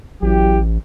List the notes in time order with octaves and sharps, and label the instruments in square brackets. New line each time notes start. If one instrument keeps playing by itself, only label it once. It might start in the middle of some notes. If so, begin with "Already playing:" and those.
[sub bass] A1 [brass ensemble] F#3 E4 G4